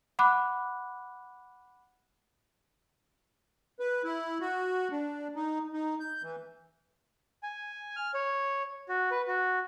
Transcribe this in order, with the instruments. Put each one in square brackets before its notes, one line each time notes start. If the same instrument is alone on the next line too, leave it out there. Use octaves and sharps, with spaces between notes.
[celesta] F#5 B5 D6 F#6
[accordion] B4
E4
F#4
D4
D#4
D#4
G6
E3
[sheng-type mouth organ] G#5
F6
C#5
F#4
B4
F#4